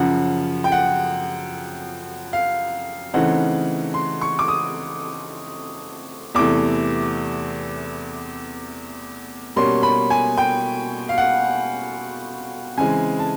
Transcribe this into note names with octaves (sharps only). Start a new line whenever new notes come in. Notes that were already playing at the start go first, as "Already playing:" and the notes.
Already playing: F#2 C#3 F3 F#5
G5
F#5
F5
C#3 E3 A3 C4 D#4 F#5
C6
C#6
D6
D#6
E2 C3 E3 A3 D6
B2 G3 A#3 C#4 C6
B5
G#5
G5
F5
F#5
C#3 E3 G#3 C4 G#5
A5